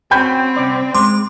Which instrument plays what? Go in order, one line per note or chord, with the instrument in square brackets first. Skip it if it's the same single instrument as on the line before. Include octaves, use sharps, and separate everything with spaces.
[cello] C4 [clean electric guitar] C#4 F#4 [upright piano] G5 B5 G6
[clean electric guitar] C2 C#4 D5
[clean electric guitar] G#3 [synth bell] C6 [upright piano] D6